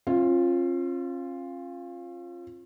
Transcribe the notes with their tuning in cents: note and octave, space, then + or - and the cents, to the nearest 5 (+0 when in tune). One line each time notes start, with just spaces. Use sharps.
C#4 -45 F4 +0